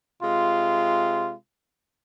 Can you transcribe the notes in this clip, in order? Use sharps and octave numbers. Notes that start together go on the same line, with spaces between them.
C3 G#3 F4